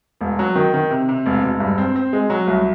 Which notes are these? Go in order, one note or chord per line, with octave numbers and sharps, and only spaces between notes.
E1
F#3
D#3
D#3
C3
C3
E1
E1
G2
C4
C4
G#3
F#3
C2